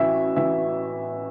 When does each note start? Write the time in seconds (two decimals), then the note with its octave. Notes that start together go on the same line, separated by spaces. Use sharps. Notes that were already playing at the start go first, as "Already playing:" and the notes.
Already playing: A1 E3 F#4 E5
0.36 E3 E5